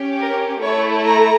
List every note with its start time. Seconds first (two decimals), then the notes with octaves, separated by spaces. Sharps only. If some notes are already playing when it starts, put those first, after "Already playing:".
Already playing: C#4 G4
0.19 A#4
0.62 A3 E4 A4 C#5
1.05 A#5